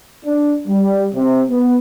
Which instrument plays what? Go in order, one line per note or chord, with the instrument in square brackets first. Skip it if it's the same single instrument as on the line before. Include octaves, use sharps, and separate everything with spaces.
[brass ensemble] D4
G3
C3
B3